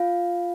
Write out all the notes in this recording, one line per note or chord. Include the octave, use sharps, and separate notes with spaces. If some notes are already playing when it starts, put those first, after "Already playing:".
Already playing: F4 F5